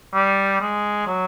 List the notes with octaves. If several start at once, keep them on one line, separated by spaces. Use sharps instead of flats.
G3
G#3
F#3